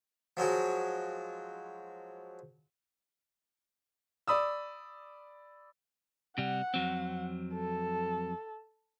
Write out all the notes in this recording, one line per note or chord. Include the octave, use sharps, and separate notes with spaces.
F3 F#3 G#3 F#4
D5 B5 D#6 E6
C3 G3 F#5
F2 F#3 C4
A4